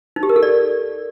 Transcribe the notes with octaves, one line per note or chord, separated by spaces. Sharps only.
D#4
G4
A#4
A4
D5